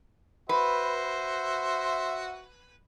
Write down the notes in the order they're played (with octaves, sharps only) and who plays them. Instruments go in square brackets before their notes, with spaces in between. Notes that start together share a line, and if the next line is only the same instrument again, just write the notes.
[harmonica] F#4 C5 E5 [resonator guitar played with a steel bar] B4